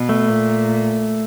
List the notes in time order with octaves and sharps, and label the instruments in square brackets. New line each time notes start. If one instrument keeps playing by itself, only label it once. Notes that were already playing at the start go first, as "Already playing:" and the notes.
Already playing: [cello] B2
[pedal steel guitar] A3
[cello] A#2